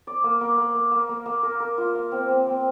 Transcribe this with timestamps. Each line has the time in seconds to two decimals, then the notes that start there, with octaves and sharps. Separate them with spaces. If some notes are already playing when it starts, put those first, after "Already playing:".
0.07 D5
0.24 A#3
0.41 A#3
0.58 A#3
0.75 A#3
0.91 A#3
1.09 A#3
1.26 A#3
1.43 A#4
1.60 A#4
1.78 F4
1.95 F5
2.12 C4
2.28 C4
2.47 C4